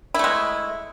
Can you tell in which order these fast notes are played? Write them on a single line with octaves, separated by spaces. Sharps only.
E4 A3 G#3